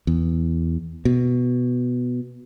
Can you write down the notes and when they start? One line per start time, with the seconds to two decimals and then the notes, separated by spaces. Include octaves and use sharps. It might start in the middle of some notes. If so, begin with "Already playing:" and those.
0.07 E2
1.05 B2